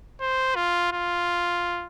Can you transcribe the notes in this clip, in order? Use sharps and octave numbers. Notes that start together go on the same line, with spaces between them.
C5
F4
F4